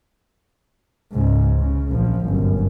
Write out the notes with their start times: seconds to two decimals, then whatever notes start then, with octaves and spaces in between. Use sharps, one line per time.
1.13 C#2 G#2
1.59 C#3
1.91 A#1 F3
2.26 G1 F#2